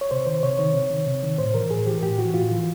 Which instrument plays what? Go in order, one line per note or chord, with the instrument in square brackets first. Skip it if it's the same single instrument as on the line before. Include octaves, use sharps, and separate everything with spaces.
[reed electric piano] C#5
C3 C5
D#3 C5
C3 C#5
D#3
C3
D#3
C3
D#3
A2 C5
E3 A#4
A2 G#4
E3 G4
A2 G4
E3 F#4
A2 F4
E3